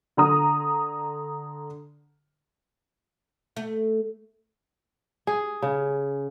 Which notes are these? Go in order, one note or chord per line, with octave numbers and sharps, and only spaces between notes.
D3 A#5 D#6
A3
G#4
C#3